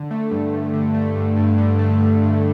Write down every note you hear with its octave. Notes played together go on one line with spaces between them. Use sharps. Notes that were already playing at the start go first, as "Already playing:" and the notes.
Already playing: D3
A3
G2
G2
D3
A3
G2
G2
D3
A3
G2
G2